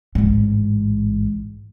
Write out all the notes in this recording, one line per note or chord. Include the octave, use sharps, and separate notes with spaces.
A1 G#2